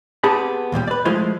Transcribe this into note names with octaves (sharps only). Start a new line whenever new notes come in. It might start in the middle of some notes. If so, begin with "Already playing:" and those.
B3 C4 G4 G#4 A5 B5
D#2 A#2 F3 G3
B4 D5
F3 G#3 A3 E4 F4 C5